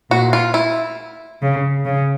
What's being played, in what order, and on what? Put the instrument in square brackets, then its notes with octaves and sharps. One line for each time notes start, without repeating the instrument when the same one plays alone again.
[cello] A#2 [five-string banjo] F#4
[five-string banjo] F4
E4
[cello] C#3
C#3